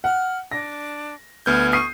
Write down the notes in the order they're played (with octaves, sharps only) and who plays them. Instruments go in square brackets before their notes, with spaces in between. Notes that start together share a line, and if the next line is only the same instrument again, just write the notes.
[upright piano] F#5 [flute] F6
[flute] D4 [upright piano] A#6
[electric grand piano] D2 B3 G6 [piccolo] F6 [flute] G#6
[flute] C#6 [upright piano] D#6 C7 D#7